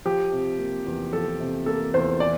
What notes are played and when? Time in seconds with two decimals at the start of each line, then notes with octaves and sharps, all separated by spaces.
0.05 F3 G4
0.32 C3
0.59 A#3
0.87 E2
1.13 F3 A4
1.40 C3
1.66 A#3 A4
1.94 E2 C5
2.20 E3 D5